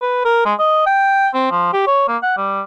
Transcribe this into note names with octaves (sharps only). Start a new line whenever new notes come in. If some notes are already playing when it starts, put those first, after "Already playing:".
B4
A#4
G#3
D#5
G5
C4
F3
G4
C#5
A#3
F#5
G3